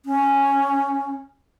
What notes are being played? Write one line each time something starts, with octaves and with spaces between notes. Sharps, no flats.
C#4